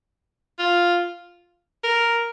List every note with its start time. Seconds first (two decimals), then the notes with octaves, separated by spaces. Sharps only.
0.59 F4
1.83 A#4